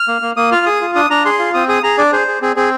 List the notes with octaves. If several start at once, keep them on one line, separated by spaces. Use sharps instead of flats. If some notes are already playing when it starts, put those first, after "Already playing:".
Already playing: F6
A#3
A#3
A#3 D#6
F4 F6
G#4 D#6
F4
D4 D#6
D4 A#5
G#4 C6
F4
C4 D#6
G#4 D#6
G#4 A#5
D4 D5
G#4 C5
G#4
C4 G#4
C4 G#4